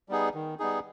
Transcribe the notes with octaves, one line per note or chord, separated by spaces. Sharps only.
G3 B3 D#4 G#4
D#3
G3 B3 D#4 G#4